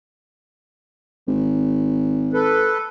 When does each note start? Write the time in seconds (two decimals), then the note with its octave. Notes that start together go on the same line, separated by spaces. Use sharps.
1.27 G#1
2.33 A4 B4